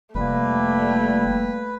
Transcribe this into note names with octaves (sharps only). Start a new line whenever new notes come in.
F1 G3 A3 A#3 B4